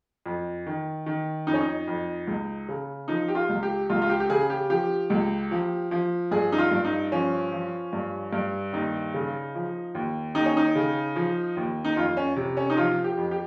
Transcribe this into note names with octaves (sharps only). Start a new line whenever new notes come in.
F2
D#3
D#3
F2 D#4
C#4
D#4
F2
C#2
C#3
F3 D#4
G4
F4
C#2
G4
C#2 F4
F4
G4
G4
C#3 G#4
G4
F3 G4
C#2
F3
F3
G2 G#4
D#4
F4
G2
D#4
F3 C#4
F3
G2
G2
D#2 D#4
C#3
F3
D#2
D#2 D#4
C#4
D#4
C#3
F3
D#2
D#4
F2 F4
C#4
C3
C#4
D#4
F3 F4
G4
F2
G4